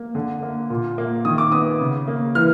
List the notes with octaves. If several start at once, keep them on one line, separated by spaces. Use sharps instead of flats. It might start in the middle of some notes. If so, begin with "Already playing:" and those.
Already playing: A#3
D3
A#3
A#2
A#3
D#3 D#6
D6
B3 D#6
C#3
A#3
E3 F6